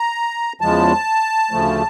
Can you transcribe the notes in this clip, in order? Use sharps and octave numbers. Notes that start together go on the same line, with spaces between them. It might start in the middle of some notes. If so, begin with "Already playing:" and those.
Already playing: A#5
E2 C#3 F3 G#3 A5
D2 C#3 F3 A3